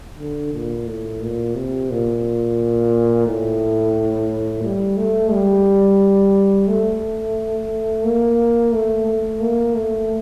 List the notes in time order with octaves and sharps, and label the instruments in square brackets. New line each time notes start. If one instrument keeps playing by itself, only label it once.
[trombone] D3
A#2
A2
A#2
C3
A#2
A2
G3
A3
G3
A3
A#3
A3
A3
A#3
A3